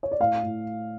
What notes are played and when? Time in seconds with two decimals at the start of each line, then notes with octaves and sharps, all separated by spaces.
0.03 C#5
0.11 D5
0.20 A2 F5
0.43 A2